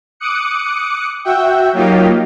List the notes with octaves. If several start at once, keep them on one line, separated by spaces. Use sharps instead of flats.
D6 D#6 F#6 C#7
F#4 E5 F#5 G5
F#3 A#3 D#4 F4 G4